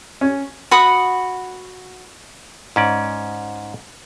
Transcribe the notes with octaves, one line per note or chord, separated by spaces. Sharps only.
C#4
F#4 F#5 B5 D#6
G#2 C#4 D5